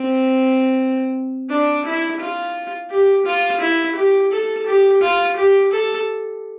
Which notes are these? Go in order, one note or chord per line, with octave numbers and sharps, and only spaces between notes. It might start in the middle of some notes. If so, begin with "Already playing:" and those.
Already playing: C4
D4
E4
F4
G4
F4
E4
G4
A4
G4
F4
G4
A4